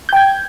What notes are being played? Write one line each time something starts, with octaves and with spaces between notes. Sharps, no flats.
G5 G6 G#6